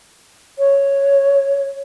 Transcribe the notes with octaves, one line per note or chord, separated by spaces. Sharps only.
C#5